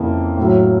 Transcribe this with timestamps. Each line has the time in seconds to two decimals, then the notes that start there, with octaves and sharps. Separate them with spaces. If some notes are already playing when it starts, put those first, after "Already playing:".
Already playing: F2 C#3 E3 A#3
0.37 A2 F#3